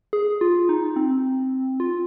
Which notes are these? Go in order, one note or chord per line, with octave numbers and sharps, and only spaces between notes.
G#4
F4
D#4
C4
F4